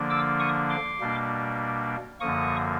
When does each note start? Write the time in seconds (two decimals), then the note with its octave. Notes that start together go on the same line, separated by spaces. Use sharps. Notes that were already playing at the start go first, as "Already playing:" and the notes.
Already playing: D3 F3 A#3 D4
0.10 D6 E6
0.40 C#6 D#6
0.70 C6 D6
1.00 B2 G3 A#3 D4
2.20 F#2 D3 F3 A#3 C#6 D#6